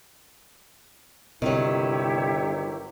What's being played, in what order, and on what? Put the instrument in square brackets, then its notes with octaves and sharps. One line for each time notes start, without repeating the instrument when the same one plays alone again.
[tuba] G1 [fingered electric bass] C3 [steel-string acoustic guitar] D#3 F#3 [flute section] E4 G4 C#5